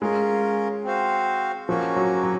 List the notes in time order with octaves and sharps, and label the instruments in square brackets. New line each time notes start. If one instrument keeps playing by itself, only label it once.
[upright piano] G#3 [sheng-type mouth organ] C#4 F4 A#4
[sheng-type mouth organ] C4 F#4 C5 F5
[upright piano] F3 [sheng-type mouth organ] A#3 C#4 F#4
[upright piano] F#3
F#3